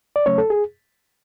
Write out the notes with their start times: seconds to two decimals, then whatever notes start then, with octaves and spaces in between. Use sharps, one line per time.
0.16 D5
0.26 C#3 F#3 A3 C#4 C#5
0.38 A4
0.50 G#4